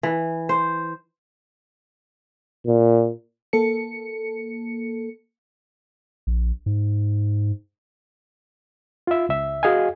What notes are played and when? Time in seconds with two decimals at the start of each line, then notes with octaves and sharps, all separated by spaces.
0.03 E3
0.49 C5
2.66 A#2
3.53 A#3 A4 C#7
6.27 A#1
6.66 G#2
9.07 F4 E5
9.29 C#2 E5
9.63 F#4 G#4 D#5 F5 G#5